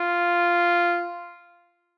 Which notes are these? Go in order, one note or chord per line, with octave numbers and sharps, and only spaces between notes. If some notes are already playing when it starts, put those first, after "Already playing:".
Already playing: F4